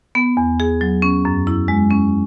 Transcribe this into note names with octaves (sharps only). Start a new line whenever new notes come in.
B3
E2
G#4
F#3
C#4
F#2
E4
G#3
C#4